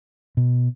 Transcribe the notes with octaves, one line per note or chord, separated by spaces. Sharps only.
B2